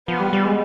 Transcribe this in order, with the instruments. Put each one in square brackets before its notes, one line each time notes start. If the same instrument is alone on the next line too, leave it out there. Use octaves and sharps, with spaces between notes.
[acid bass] F3 [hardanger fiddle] B3
[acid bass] G3
G3
G#3